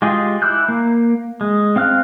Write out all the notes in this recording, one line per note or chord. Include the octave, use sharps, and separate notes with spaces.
G#3 F4 G4 G#4
E4 D6 E6 F#6 G6
A#3
G#3
C4 F5 F6 F#6